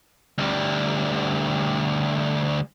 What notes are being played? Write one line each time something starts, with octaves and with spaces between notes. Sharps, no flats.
D2 G3